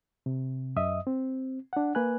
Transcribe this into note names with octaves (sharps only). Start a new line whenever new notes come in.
C3
F#2 D#5 E5 D#6
C4
D4 F#5
A#3 B4 G#5 F#6